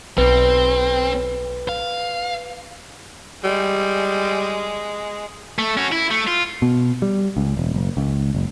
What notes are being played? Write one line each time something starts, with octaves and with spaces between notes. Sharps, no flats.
B1 C4 B4
F5
G3 G#3
A3
C#4 F#4
E4
A3
F4
B2
G3
C#2
E1
F#1
C#2
F#1